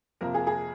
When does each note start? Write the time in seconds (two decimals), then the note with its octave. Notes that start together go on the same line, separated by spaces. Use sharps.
0.21 F2 C3 F3 A#3 A#4
0.34 G#4
0.47 G#4